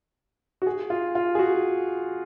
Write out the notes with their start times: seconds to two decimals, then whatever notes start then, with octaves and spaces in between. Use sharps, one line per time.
0.62 F#4
0.67 G#4
0.90 F4
1.15 F4
1.35 G#4
1.39 F#4